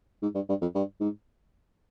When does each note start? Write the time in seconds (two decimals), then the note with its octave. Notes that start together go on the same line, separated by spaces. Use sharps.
0.22 G#2
0.35 G2
0.49 G2
0.61 F2
0.75 G2
1.00 G#2